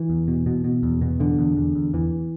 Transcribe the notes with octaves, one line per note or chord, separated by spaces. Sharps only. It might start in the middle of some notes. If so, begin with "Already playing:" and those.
Already playing: E3
E2
B2
B2
B2
E2
B2
E2 D3
E2
E2
E2
E2 E3